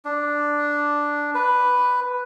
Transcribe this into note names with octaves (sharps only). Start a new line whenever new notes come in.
D4
B4